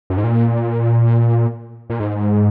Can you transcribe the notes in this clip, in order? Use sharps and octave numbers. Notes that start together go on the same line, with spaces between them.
F#2
G#2
A#2
A#2
G#2